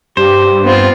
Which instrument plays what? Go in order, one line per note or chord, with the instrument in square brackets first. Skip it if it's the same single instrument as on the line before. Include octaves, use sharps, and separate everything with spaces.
[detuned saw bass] G2 [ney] G4 [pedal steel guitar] C5
[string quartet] B3 C4 F4